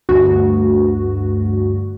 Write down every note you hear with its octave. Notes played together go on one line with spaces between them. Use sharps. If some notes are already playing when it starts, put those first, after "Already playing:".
D2 G2 F#4